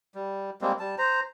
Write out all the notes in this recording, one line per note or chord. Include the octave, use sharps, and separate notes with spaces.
G3
G3 G#3 A#3 C4
G3 A5
C5 A#5